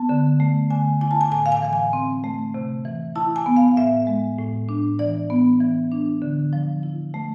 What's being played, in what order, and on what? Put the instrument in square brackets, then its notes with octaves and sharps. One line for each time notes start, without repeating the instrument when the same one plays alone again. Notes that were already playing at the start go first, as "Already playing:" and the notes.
Already playing: [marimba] B3 A5
D3
A3
D3 G#5
E4 G#5
A5
G#5
A2 G#5
F5
G#5
E3 F5
G#5
C4
A3
C3
E3
E4 A5
G#5
B3
F5
A2 E5
G#3
A2
D4
E3 D5
B3
E3
D4
D3
F3
E4
A3